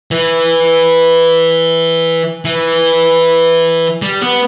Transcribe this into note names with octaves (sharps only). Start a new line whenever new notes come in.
E3
E3
G3
B3